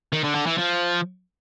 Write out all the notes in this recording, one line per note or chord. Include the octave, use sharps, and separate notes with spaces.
D#3
D3
D3
E3
F3